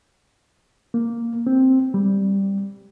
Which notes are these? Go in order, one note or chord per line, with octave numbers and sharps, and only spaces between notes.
A#3
C4
G3